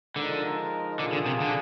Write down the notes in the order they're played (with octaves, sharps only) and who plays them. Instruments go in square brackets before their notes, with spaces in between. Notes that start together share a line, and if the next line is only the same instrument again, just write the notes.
[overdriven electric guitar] D3 [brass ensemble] F3 G#3 D#4 A#4
[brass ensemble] A#2 F3 A#3 F4 G#4 [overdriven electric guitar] D3
[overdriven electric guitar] D3
C3
D3